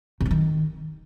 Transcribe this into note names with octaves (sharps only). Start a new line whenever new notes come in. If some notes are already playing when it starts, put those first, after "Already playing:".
C3
G2
D#3